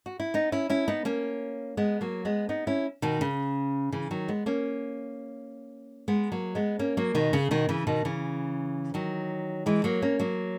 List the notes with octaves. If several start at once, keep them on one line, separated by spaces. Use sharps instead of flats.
F#4
E4
B3 D#4
C#4 E4
C#4 E4
B3 D#4
A#3 C#4
G#3 B3
F#3 A#3
G#3 B3
B3 D#4
C#4 E4
B2 D#3
C#3
C#3 E3
D#3 F#3
G#3 B3
A#3 C#4
G#3 B3
F#3 A#3
G#3 B3
A#3 C#4
F#3 A#3
B2 D#3
C#3
B2 D#3
C#3 E3
B2 D#3
C#3 E3
D#3 F#3
E3 G#3
F#3 A#3
A#3 C#4
F#3 A#3